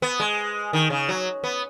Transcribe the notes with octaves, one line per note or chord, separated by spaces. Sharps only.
B3
G#3
D#3
C#3
F#3
B3